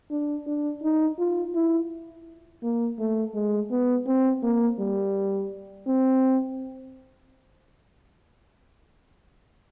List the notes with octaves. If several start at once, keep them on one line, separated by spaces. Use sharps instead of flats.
D4
D4
D#4
F4
E4
A#3
A3
G#3
B3
C4
A#3
G3
C4